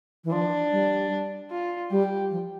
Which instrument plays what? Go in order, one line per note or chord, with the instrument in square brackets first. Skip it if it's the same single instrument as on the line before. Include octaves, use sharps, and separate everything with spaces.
[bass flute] E3
[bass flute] F3 [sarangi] D4
[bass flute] G3
[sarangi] F4
[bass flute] G3 [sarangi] G4
[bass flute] F3